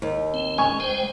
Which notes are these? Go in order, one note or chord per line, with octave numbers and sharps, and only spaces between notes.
D#2
C4
C#2 C#4 G#5 C#6
G#3 C5 G5